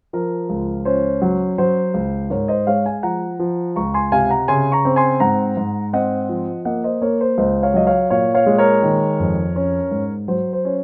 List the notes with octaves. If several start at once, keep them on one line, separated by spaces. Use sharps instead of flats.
F3 A#4
C#2
C#4 C5
F#3
F#3 C5
C#2
G#2 A#4 C#5
C5 D#5
G#3 C#5 F5
F5 G#5
F3 F#5 A#5
F3
C#2 A#5 C#6
G#5 C6
C3 F5 G#5
F#5 A#5
C#3 G#5 C6
A#5 C#6
C4
G#5 C6
G#2 F#5 A#5
G#2
C4 D#5 F#5
F3
A#3 D#5 F#5
C5 D#5
A#3 A#4 C#5
C5
C#2 C5 D#5
C#5 F5
F#3 D#5
C#5 F5
A#2 C#5 F5
C#5 F5
G#3
A#4 C#5
D#3
F2
C#4
G#2
F#3 C5
C5
C#4